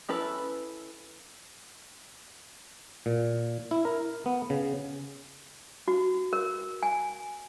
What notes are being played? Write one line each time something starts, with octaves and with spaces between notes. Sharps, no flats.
C#4 E4 A4 B4
A#2
E4
A#4
B3
C#3
F#4
A#4
G#5